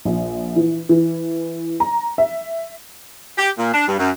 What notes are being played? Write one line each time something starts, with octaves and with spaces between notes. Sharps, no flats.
A#1
E3
E3
A#5
E5
G4
A#2
D4
G2
F#2